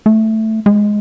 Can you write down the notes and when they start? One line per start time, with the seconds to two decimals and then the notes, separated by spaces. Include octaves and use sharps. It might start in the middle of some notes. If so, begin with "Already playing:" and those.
0.06 A3
0.66 G#3